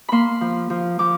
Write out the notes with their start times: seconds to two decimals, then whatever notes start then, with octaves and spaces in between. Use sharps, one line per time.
0.09 A#3 B5 C6
0.41 F3
0.70 F3
0.99 F3 D6